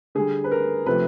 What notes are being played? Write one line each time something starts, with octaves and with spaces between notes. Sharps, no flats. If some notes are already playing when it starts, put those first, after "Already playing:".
D3 G3 G#4
B4
A#4
C3 F3 A3 B4